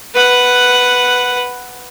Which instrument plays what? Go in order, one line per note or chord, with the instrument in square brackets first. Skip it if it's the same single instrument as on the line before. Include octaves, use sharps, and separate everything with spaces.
[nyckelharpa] B4 F#5